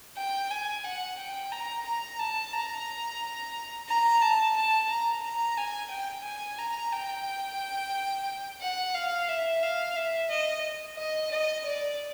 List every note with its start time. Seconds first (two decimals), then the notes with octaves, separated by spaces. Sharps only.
0.17 G5
0.50 G#5
0.84 F#5
1.18 G5
1.51 A#5
1.85 A#5
2.19 A5
2.53 A#5
3.88 A#5
4.21 A5
4.56 A5
4.89 A#5
5.23 A#5
5.57 G#5
5.90 G5
6.24 G#5
6.58 A#5
6.92 G5
8.61 F#5
8.95 F5
9.28 E5
9.62 F5
9.96 E5
10.30 D#5
10.97 D#5
11.31 D#5
11.65 D5